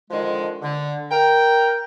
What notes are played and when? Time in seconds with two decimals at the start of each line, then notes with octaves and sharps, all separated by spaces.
0.11 D3 D#3 F3 G#3
0.62 D3
1.11 A#4 G5